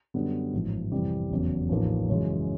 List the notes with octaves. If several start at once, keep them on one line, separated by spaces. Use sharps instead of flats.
F#2 D3 G3 B3
A1 G#2 F3
F2 C3 E3 G3 C4
F1 E2 C#3 F#3
A1 A2 F3 A#3 D#4
F#2 C#3 E3 G#3